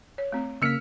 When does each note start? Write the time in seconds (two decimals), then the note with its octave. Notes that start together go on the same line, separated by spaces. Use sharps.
0.18 C#5
0.32 A3 C4
0.62 C#3 A#3 E6 F6 B6 C#7